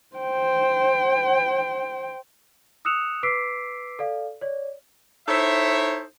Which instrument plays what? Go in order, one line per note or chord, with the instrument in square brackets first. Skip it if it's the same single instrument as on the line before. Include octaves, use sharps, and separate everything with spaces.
[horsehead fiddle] C5 G5
[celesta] D#6 E6 F#6 C#7 E7 F7
B4 D6 E6 B6 C7 D7
A4 D5 F5
C#5 D5
[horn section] D#4 E4 A4 C5 C#5 E5